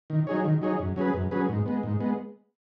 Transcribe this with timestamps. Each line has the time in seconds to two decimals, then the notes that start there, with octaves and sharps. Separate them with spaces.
0.10 D#3
0.27 F#3 D#4 G#4 C#5
0.44 D#3
0.62 F#3 D#4 G#4 C#5
0.79 F#2
0.96 F#3 C#4 G#4 B4
1.14 F#2
1.31 F#3 C#4 G#4 B4
1.49 G#2
1.66 G#3 B3
1.83 G#2
2.00 G#3 B3